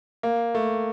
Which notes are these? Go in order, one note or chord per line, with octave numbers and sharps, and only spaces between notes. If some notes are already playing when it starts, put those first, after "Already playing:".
A#3
A3